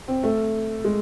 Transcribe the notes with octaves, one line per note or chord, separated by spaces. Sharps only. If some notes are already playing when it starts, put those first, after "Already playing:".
C4
A3
G#3